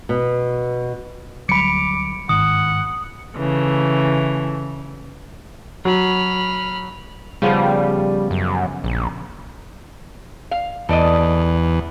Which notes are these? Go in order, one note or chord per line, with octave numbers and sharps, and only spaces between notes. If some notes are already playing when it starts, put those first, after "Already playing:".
B2
D2 F#3 G3 B5 D6 C#7
G1 G#2 D#3 F#5 D#6
C#3 E3 A3
F#3 B5 F6
C#3 F3 G3 B3
F#2
A#1
F5
E2 A4 D5 D#5